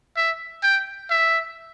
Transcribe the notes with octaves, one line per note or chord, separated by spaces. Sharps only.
E5
G5
E5